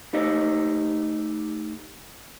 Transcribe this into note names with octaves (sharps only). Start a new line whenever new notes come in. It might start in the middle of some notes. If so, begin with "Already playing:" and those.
A3 D#4 G4 D#5